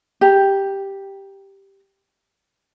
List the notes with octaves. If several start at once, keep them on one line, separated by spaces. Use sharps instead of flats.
G4 A#5